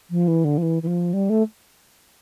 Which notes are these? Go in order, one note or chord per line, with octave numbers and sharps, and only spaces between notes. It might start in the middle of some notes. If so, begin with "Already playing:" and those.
F3
E3
D3
F3
E3
E3
F3
G3
A3